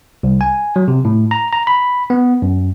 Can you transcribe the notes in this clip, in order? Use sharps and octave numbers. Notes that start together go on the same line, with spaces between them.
C2
G#5
F#3
C3
A2
A#5
A#5
B5
B3
F#2